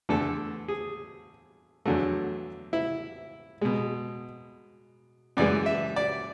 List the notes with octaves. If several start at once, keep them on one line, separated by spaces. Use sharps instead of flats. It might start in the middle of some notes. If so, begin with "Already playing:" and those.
E2 D3 A3 A4
G#4
E2 D3 F#3 A3
E4
B2 G#3
F#2 E3 G#3 D5
E5
D5